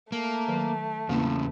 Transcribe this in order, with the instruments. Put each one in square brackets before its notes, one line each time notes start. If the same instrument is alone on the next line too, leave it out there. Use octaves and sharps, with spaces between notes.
[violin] A3 [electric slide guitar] A#3
[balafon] D#3 F#3
[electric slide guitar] E2 C#3 [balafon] A#3 C4 E4